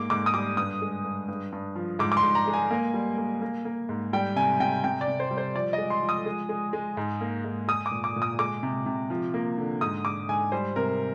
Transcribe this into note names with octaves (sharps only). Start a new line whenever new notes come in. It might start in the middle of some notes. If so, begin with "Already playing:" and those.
Already playing: G#2 A#3 D6
G#2 D6
D#6
G3 D6
G2 D#6
G#3
G2
G2
G2
F3
G#2 D6
D6
C6
G#2
A#5
G#3
G#5
A#3
G3
A#3
A#3
A#3
G#2
G3 G5
C3 G#5
C3 G5
C3 G5
D5
C3
C5
G3
C5
F3 D5
G#3 D#5
C6
F3
D#6
G#3
G#3
G#3
G#2
A#3
G#2
G#3 D#6
D6
A#2
D6
A#2
D#6
G#3 D6
C3
C3
F3
A#3
D3
G#2 D#6
G#2 D6
G#2 G#5
G3 C5
C3 A#4